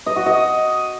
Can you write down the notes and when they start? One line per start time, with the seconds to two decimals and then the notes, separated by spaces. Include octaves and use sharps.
0.06 D#5
0.16 F#4
0.26 D#5